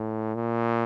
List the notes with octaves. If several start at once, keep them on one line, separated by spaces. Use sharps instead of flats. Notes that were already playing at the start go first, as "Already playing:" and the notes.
Already playing: A2
A#2